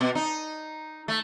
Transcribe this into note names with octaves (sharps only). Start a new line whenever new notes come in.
B2
D#4
A3